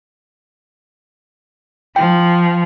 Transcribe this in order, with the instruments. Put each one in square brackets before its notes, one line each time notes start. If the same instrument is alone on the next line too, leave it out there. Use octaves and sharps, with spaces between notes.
[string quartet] F3 [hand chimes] G5